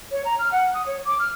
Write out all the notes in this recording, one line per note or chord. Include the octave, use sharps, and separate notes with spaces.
C#5
A#5
F6
F#5
D#6
C#5
D6
F6